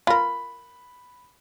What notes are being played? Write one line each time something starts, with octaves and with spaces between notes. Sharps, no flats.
F4 A#4 B5